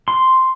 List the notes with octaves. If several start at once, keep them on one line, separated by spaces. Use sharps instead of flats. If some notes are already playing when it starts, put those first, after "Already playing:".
C6